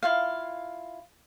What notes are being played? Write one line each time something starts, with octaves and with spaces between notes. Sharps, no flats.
E4 F4 F5